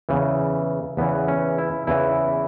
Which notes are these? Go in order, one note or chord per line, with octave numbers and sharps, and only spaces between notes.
E2 C#3 E3
E2 C#3 E3 B3
C#4
E4
E2 C#3 E3 E4